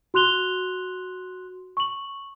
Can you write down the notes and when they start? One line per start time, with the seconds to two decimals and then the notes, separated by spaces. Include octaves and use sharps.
0.14 F#4 C6 F#6 F7 G7
1.77 C#6 F#7